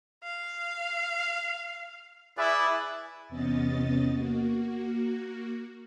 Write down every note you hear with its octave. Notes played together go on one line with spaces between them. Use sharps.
F5
E4 G#4 B4 D5
E2 C3 B3 C#4 D#5 A6
A#3 F#4